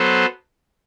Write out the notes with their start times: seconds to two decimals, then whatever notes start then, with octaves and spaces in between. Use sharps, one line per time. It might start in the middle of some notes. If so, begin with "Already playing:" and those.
Already playing: F#3 B3 A4 C5